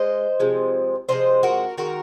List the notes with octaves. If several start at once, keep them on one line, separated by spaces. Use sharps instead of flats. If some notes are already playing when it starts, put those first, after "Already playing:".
Already playing: G#3 C5 D#5
C3 F3 G#3
C3 F3 G#3 C5 D#5
F#4 A#4
D#3 G#3 F#4 A#4